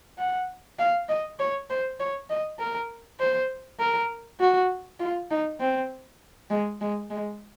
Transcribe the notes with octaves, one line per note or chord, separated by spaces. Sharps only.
F#5
F5
D#5
C#5
C5
C#5
D#5
A#4
C5
A#4
F#4
F4
D#4
C4
G#3
G#3
G#3